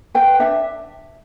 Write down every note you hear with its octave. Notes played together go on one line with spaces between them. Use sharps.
B4 G5
D4 E5